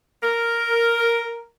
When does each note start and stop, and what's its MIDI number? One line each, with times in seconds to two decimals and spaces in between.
0.23 1.47 70